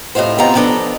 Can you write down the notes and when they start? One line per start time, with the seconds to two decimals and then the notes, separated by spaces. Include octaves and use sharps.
0.15 A2 C3 D#4 F4 C5
0.38 C3 B3 C4 F4 G5 A#5
0.55 F3 B3 D4 A4 D#5